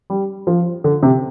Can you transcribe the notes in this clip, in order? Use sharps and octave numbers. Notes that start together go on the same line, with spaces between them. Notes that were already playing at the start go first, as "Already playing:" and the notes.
G3
F3
D3
C3